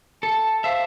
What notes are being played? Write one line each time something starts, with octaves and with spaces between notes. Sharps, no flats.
A4 A5
C5 E5 F5